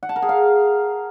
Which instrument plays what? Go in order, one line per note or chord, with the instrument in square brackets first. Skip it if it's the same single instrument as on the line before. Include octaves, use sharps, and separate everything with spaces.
[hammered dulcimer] F#5
A5
A#4
G#4
F5